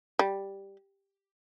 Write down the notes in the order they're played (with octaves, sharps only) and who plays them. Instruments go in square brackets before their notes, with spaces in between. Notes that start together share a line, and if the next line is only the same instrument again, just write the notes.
[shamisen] G3